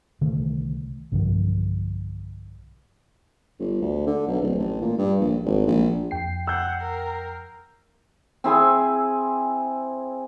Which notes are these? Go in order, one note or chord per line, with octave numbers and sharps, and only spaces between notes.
C2 D3 D#3 A3
B1 G2 D3 F3
G1
D2
D3
B1
D1
A1
A#2
G2
A#1
G#1
A#1
F2 G5 C7
F#5 E6 G6
A#4
C4 E4 G#4 G#5